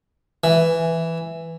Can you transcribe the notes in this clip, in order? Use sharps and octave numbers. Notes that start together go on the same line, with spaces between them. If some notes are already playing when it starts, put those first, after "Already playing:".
E3